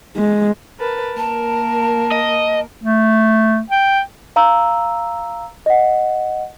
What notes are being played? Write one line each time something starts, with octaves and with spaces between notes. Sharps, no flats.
G#3
A#4 B4 A5
A#3 A#4 A5
D#5
A3
G5
F5 A#5 E6
D#5 F#5